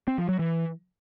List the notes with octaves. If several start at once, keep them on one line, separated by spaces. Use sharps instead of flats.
C4
F3
F#3
E3